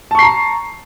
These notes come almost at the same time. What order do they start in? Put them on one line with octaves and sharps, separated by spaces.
A5 C#6 C7 A#5